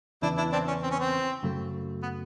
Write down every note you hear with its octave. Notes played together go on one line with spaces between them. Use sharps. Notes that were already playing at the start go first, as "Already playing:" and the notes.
E2 C#3 E3 D4 E4
D4 E4
C4 D4
C#4
C4
C#4
C4
F#2 C#3 F#3 A3
B3